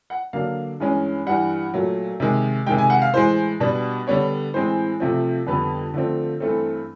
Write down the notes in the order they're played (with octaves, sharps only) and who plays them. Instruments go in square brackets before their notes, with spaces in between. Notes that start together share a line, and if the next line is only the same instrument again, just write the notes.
[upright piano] F#5
D3 F#3 A#3 D4 F5
G2 E3 G#3 C#4
G2 E3 G3 F#5
A#2 F#3 A3
C3 D#3 G#3
C3 D#3 G#3 G5
G#5
F#5
F5
A2 E3 G#3 C5
B2 G3 B3 D4
D3 G3 B3 D4 C#5
A2 E3 G#3 C4 C5
C3 F3 A3 C4
F2 D3 G3 B3 B4
D3 F3 A3 C4
G2 E3 A3 C4 A4